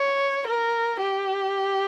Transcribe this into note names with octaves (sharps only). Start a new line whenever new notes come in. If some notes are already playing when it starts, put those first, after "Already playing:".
Already playing: C#5
A#4
G4